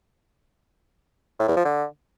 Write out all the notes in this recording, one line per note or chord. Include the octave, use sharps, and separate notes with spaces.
A2
E2
F3
D3